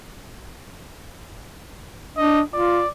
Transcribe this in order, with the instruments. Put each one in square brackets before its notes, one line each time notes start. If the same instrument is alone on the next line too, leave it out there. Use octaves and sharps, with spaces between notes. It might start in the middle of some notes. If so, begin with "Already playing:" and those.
[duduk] D4 [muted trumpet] D#5
[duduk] F4 [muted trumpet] D5